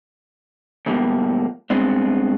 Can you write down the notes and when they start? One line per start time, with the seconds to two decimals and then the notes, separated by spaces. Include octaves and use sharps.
0.86 D2 G#2 B2 F3 G3 A#3
1.70 G2 G#3 B3 C4 D4